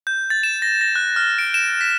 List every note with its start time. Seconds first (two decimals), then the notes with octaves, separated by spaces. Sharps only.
0.07 G6
0.30 A6
0.43 E7
0.62 A#6
0.81 A#6
0.96 F#6
1.16 F6
1.39 D7
1.54 E7
1.81 B6